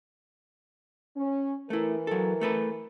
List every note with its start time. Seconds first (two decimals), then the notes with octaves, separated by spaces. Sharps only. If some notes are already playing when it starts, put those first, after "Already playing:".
1.17 C#4
1.70 E3 A3 E4 A#4
2.07 F#3 A4
2.41 A3 A4 B4